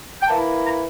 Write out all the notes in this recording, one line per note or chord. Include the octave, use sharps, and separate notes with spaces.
G5
E3 A#3 E4 A5
A#5